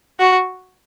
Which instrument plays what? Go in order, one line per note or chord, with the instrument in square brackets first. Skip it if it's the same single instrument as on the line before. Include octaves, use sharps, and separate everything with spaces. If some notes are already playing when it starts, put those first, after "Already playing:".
[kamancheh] F#4